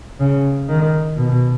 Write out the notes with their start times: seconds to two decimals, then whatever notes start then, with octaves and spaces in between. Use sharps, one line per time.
0.20 C#3
0.69 D#3
1.16 B2